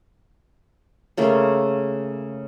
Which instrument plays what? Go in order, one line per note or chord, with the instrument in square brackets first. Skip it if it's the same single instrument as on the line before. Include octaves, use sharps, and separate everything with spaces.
[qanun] C#3 A3 A#3